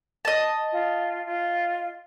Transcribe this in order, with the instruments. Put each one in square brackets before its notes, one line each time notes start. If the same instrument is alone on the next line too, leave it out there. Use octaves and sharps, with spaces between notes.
[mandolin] D#5 A5
[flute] F4
F4